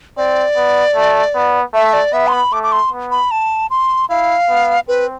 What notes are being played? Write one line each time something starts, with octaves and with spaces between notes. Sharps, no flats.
C4 D5
B3
A3
B3
A3 E5
D5
B3 E5
C6
B5
A3 D6
D6
C6
B3
B5
A5
C6
E4 F5
B3
C4 B4